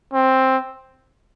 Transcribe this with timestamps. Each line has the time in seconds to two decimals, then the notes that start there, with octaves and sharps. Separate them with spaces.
0.13 C4